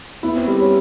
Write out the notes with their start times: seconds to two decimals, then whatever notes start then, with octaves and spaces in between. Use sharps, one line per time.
0.23 B3 E4
0.36 C4
0.47 G3
0.60 C#4